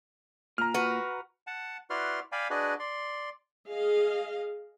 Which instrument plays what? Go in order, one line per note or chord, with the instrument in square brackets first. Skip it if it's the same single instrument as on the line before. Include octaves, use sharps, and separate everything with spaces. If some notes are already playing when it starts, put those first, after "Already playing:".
[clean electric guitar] A#2 [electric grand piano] A#5 F6
[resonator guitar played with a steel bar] F#4 B4
[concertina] F#5 A5
E4 F#4 B4 D5 C6 F6
D5 F5 G5 G#5 B5
D4 F#4 G#4 B4 D5 D#5
D5 C6
[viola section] G#4 D#5 F5